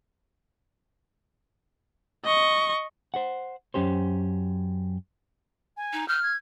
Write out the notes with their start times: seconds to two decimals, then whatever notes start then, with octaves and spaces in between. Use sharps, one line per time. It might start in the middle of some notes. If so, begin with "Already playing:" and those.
2.25 D#5 C#6
3.14 C5 F#5
3.74 F#2 C#4 G4 C5
5.77 G#5
5.93 D#4
6.08 F6 G6
6.23 G#6